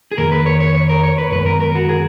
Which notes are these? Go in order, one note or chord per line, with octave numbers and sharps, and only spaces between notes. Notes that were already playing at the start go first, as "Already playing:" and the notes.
G#4
F2 D#3 A#3 A#4
B4
C#5
C#5
C#5
A#4
C#5
B4
F#2 D#3 G#3 B3 B4
A#4
A#4
F#4
G#4